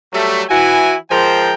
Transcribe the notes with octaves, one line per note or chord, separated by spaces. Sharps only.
F#3 G3 A3
E3 E4 F#4 G#5
F3 G#3 A#4 C5 G5